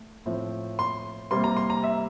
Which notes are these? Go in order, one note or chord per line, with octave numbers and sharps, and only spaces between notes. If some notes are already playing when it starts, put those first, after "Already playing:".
Already playing: A3
A2 F3 C4
C6
C3 G3 A#3 C6
A#5
C6
A#5
E5